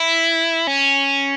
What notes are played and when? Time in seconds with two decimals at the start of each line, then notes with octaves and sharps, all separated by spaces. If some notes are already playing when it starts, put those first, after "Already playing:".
Already playing: E4
0.67 C#4